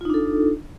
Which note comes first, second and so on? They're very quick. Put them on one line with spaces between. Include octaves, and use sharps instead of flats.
F4 D#4 D4 A4